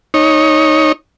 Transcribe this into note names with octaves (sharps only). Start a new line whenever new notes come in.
D#4 C#5